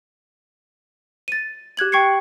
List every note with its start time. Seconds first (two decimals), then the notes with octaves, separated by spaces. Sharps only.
1.28 A6 D#7
1.77 G4 F#6 G#6 F#7
1.92 G5 C#6 G#6 C7 C#7